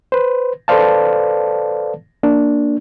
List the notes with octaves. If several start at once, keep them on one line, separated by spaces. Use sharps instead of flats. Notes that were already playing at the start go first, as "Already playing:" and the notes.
B4 C5
A4 B4 C5 D5 F5 A5
A#3 D4